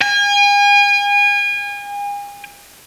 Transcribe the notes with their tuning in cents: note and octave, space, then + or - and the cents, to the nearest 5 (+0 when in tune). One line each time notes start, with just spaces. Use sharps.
G#5 -35